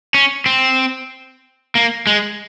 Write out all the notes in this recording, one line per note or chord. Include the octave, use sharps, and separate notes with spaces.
C#4
C4
A#3
G#3